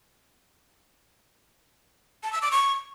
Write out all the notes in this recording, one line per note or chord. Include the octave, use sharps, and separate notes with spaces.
A5
E6
D6
C#6